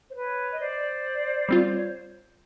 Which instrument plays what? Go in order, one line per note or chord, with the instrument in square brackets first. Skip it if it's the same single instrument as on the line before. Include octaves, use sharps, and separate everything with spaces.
[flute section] C5
B4 C#5
D#5
C5 D5
[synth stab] G3 C4 F4
[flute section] C#5